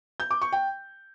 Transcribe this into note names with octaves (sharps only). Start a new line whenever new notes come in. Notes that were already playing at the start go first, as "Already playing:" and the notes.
G6
D6
C#6
G5